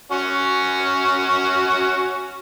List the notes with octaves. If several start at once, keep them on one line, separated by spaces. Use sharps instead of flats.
C#4 F#4